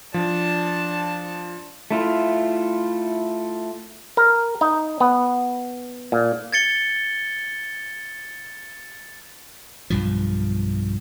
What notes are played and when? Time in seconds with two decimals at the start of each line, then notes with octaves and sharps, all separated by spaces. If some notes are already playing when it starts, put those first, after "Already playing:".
0.14 F3 D4 A5
1.91 A3 E4 F4
4.17 A#4
4.61 D#4
5.00 B3
6.12 A#2
6.53 G#6 A6 C#7 G7
9.90 B1 G2 F3